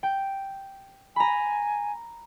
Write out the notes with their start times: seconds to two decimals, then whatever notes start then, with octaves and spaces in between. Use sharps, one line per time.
0.03 G5
1.16 G#5 A#5 B5